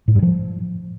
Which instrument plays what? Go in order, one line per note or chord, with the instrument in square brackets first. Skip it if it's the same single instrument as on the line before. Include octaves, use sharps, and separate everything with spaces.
[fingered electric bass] A2
G2
F3